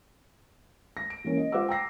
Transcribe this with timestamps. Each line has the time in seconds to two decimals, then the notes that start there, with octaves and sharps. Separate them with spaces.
0.97 A#6
1.10 D7
1.24 E3 A#3 C#4
1.37 D#5
1.52 F4 C5 F5 F#5 D6 E6
1.69 G5 A#5 E6 A#6 C7